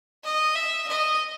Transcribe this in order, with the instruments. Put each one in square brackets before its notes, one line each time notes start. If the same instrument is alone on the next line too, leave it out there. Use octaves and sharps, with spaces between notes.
[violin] D#5
E5
D#5